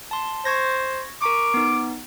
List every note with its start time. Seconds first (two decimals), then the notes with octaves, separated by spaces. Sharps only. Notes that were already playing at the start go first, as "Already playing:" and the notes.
0.11 A5 C6
0.45 C5 C#6 G#6 A#6
1.22 A#4 A#5 C#6 D6
1.54 B3 D#4